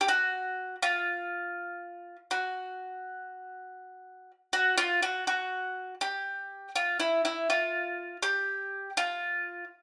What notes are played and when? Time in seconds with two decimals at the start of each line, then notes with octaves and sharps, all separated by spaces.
0.01 G4
0.08 F#4
0.83 F4
2.31 F#4
4.53 F#4
4.78 F4
5.02 F#4
5.27 F#4
6.01 G4
6.76 F4
7.00 E4
7.25 E4
7.50 F4
8.23 G4
8.97 F4